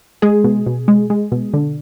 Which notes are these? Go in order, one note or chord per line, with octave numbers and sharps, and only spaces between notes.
G#3 G#4
B2
B2
G#3
G#3
B2
D3